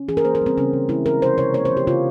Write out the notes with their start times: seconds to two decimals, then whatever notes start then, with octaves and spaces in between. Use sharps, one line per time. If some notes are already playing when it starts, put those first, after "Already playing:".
Already playing: C#4
0.09 E3 G#4
0.17 A#4
0.25 A#3 C5
0.35 A#4
0.41 G3 C4
0.57 C#3 C#4
0.73 C#3
0.89 G#3 E4
1.05 E3 A#4
1.22 C3 C5
1.38 C3 C#5
1.54 A#3 C#5
1.65 C5
1.70 F3
1.77 G4
1.87 C#3 F4